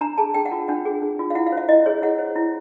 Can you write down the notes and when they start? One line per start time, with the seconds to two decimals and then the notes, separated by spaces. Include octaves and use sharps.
0.01 D4 A#5
0.18 G#4 A5
0.34 D4 G5
0.46 F#5
0.52 F4
0.68 D4 F#5
0.85 G#4
1.02 D4
1.19 F4
1.30 F5
1.35 E4 F#5
1.47 F5
1.52 C5
1.57 E5
1.68 E4 D#5
1.86 G#4 C#5
2.02 E4 F#5
2.19 C5
2.36 E4